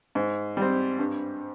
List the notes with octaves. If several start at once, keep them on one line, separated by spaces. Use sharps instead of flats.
G#2
G3 C4
G2